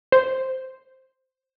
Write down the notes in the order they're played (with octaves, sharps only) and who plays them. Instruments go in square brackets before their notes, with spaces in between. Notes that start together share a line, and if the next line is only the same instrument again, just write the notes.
[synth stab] C5